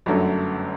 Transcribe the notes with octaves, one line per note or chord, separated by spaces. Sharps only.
G1 F#2 D3 F#3 A3